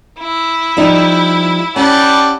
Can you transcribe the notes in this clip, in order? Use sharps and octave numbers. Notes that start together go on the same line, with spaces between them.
E4
F3 G3 D#4
G3 C#4 F#5 A5